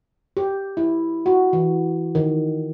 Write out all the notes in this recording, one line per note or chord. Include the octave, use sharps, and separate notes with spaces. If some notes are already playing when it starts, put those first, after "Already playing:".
G4
E4
F#4
E3
D#3